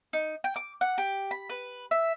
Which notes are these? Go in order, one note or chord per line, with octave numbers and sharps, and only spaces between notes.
D#4
G5
D6
F#5
G4
B5
B4
E5